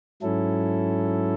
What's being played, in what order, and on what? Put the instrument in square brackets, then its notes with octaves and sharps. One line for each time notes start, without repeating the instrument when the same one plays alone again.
[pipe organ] G#2 F#3 C#4 E4 A4